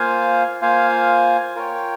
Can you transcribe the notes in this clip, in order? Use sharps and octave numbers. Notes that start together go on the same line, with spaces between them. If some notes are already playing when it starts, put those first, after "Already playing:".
Already playing: A#3 F4 C5 F5 G#5
A#3 F4 C5 F5 G#5
F4 A#4 C#5 G5